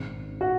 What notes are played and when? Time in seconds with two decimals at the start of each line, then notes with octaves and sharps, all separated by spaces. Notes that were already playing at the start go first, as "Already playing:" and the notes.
Already playing: G#1 G#2 D#3
0.41 F#4